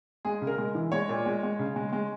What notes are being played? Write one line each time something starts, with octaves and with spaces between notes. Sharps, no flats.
G#3 G#4
C#3
A#4
G#3
E3
G#3 C#5
A#2
G#3
G#3
C#3
G#3
G#3